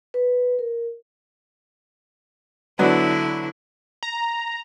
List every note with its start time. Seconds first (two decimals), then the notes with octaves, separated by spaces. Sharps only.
0.14 B4
0.59 A#4
2.79 D3 F#3 B3 D4 E4
4.03 A#5